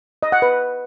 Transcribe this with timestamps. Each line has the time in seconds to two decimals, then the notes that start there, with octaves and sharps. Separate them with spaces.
0.23 D#5
0.32 F#5
0.42 B4